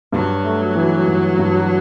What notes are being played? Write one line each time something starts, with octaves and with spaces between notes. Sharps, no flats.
G2 F#3
A3
E3
G2
G2